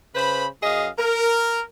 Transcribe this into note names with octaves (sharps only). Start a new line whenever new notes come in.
C#3 B4 C5 B5
F#2 G#4 D#5 F5
A#4